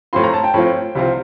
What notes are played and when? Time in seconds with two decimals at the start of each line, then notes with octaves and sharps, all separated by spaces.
0.13 A2 F3 C4 F4 C6
0.24 A#5
0.34 A5
0.44 G5
0.54 A2 F3 C4 F4
0.95 C2 C3 F3 C4 F4